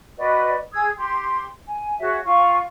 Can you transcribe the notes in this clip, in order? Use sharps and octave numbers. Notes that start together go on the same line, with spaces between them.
F#4 B4 D5 D#5
G#4 D#6 E6 G#6
G4 C6
G#5
F#4 G#4 C#5 E5
F4 C#6